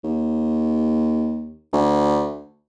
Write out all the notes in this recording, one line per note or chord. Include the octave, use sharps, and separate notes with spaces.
D#2
D2